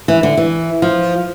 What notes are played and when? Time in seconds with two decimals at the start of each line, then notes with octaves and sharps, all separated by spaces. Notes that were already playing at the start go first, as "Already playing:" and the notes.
0.08 E3
0.23 D3
0.37 E3
0.82 F3